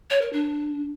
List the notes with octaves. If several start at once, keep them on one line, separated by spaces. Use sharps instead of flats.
C#5
A#4
D4